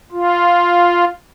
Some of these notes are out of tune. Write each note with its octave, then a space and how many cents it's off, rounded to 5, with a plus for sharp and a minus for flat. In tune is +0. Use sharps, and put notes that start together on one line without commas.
F4 +0